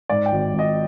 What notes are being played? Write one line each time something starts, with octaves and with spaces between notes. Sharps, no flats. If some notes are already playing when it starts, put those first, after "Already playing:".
G#2 D5
G5
G#1
G#1
D#5